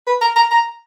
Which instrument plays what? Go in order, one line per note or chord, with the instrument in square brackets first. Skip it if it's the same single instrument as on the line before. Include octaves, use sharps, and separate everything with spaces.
[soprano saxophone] B4
A#5
A#5
A#5